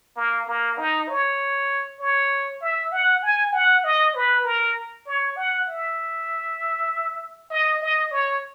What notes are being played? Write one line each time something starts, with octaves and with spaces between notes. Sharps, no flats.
A#3
A#3
D#4
C#5
C#5
E5
F#5
G#5
F#5
D#5
B4
A#4
C#5
F#5
E5
D#5
D#5
C#5